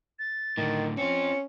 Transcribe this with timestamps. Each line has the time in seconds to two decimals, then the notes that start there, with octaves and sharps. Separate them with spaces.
0.19 A6
0.58 A2 D3 D#3
0.98 C4 C#4 F4 C#7